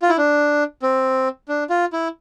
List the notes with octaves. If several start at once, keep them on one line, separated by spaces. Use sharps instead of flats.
F4
E4
D4
C4
D4
F4
E4